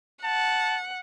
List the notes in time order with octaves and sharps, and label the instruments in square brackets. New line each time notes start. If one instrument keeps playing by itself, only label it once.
[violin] F#5 [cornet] A5